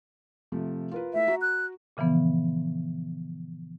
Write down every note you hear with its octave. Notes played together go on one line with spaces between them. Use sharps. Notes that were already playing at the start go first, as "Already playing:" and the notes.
C3 F3 A3
F4 A#4 B4
A3 E4 E5
F#4 A#5
F#6
A#2 C#3 E3 F3 B3